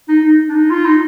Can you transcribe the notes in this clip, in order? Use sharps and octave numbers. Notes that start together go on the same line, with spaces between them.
D#4
D#4
D4
D#4
F4
D#4